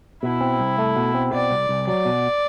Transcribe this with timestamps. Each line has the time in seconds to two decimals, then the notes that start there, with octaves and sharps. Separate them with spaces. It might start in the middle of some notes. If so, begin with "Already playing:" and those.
0.23 B2 E4
0.41 C4
0.59 C2
0.78 A3
0.96 B2
1.15 C4
1.33 B2 D5
1.51 C2
1.69 C2
1.87 F#3 D5
2.05 B2